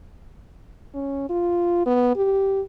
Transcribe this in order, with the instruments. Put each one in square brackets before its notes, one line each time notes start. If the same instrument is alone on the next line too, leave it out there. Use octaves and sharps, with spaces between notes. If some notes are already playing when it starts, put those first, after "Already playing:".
[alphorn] C#4
F4
B3
G4